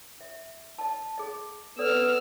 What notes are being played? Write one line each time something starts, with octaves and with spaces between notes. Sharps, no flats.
E5
D#5 A5
G#4 D#5
B3 A4 D5 E6 F6